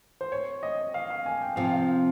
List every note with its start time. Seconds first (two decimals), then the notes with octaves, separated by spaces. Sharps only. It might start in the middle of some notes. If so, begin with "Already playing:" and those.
0.21 C5
0.32 C#5
0.63 D#5
0.94 F5
1.10 F5
1.26 G#5
1.41 G5
1.56 C3 F3 C4 F5
1.65 G5
1.73 F5